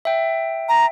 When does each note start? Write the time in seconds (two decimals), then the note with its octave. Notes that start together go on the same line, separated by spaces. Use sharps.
0.05 E5 G5
0.69 A#5